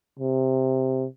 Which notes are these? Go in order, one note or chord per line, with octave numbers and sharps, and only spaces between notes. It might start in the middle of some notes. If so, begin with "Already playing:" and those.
C3